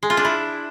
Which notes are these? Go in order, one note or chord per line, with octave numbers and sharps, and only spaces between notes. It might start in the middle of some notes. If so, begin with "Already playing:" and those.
G#3
F4
D4
E4